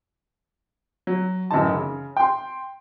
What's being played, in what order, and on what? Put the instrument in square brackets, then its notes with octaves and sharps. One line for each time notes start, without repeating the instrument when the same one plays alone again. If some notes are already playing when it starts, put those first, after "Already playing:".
[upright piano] F#3
A1 F#2 E3 D#4 A5
C#3
G5 C6